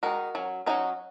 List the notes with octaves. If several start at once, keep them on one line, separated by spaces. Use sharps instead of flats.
D#3 G#3 D#4 F#4 A#4
F#3 C#4
F#3 C#4 D#4 F#4